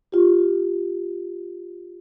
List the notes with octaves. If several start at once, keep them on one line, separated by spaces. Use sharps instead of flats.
F4 G4